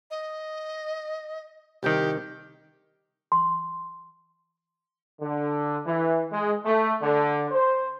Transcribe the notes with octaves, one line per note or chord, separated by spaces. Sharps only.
D#5
C2 D#3 G4
C6
D3
E3
G#3
A3
D3
C5